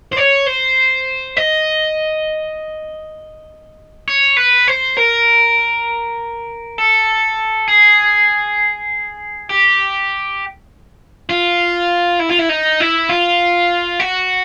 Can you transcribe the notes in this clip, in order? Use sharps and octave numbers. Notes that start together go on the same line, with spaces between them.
C5
C#5
C5
D#5
C#5
B4
C5
A#4
A4
G#4
G4
F4
E4
F4
E4
D#4
E4
F4
F#4